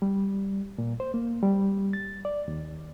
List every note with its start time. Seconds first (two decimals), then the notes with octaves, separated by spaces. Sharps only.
0.02 G3
0.78 A#2
1.00 C5
1.14 A#3
1.43 G3
1.93 A6
2.25 D5
2.48 D#2